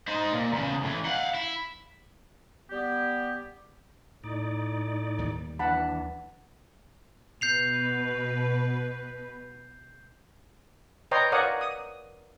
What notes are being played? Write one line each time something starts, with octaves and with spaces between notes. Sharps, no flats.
D#4 C5
A#2
E2 C#3
A2 E3
F5 F#5
E4
G3 B3 G4
A2 D#4 D5
D#2 G3
E3 D4 F#5 A5 B5
B2 B4 G6 C7 F7
B4 C#5 D#5 G5 A#5 C6
A#4 C#5 D5 F5 F#5 D#6
D#6